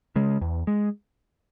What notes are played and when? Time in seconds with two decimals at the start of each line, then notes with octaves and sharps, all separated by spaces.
0.16 C#3 G#3
0.41 E2
0.67 G#3